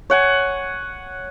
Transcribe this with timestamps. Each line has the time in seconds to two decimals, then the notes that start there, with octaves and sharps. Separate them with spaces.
0.10 C#5 F#5 G#5